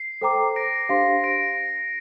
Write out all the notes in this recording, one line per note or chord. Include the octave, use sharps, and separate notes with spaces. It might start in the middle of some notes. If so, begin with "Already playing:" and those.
Already playing: C7
A4 C5 G5 A#5 D6
A#6 D7
D4 G4 C5 F5 C6
A#6 D7